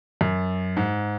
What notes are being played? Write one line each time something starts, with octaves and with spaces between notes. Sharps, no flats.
F#2
G#2